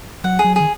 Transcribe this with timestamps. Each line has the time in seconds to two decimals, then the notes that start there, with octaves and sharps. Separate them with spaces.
0.24 F#3 F#5
0.39 G#4
0.44 F#3
0.56 D#3 G#4